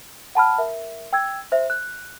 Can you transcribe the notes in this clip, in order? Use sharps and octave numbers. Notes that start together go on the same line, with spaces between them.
F#5 A5 B5 F6
A#4 E5
G5 E6 G#6
C5 E5
F#6